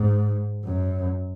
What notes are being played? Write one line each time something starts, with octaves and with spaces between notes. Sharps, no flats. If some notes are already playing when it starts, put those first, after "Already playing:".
Already playing: G#2
F#2